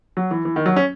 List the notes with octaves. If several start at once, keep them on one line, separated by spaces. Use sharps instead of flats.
F#3
E3
E3
D#3
F#3
C#4